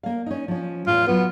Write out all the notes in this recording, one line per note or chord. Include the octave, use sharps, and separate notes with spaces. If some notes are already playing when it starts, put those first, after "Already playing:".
A#3 F5
C#4 D#4
F3 C#4
E2 A2 F4
F#3 B3 F4 B4